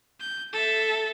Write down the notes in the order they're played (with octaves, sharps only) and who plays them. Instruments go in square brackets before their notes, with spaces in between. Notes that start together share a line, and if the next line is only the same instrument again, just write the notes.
[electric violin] G6
A4 E5